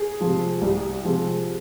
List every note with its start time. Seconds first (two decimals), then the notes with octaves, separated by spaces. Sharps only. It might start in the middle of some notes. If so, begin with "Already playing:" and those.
Already playing: G#4
0.20 C3 F3 G#3
0.61 C2
1.04 C3 F3 G#3